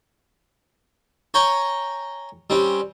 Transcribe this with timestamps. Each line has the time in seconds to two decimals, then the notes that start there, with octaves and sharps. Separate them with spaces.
1.34 C#5 G5 G#5 A#5 C#6
2.50 G3 C4 C#4